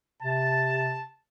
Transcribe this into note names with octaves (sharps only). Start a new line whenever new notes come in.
C3 A5